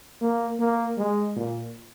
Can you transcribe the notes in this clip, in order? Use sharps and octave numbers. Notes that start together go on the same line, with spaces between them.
A#3
A#3
G#3
A#2